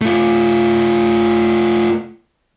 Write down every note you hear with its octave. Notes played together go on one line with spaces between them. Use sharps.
A3 F4